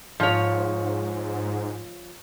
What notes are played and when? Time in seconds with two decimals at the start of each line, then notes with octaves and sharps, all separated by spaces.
0.20 G#2 F3 C#5